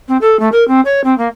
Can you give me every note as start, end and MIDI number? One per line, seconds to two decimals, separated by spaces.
0.08 0.17 60
0.21 0.39 69
0.40 0.49 57
0.52 0.66 70
0.68 0.81 60
0.85 1.01 73
1.04 1.17 60
1.18 1.28 58